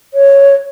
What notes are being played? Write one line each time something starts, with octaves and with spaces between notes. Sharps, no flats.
C#5